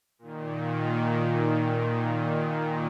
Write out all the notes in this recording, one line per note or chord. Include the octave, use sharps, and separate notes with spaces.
A#2 D#3